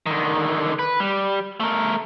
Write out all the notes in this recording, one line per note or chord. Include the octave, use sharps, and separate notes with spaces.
D3 D#3
B4
G3
A3 A#4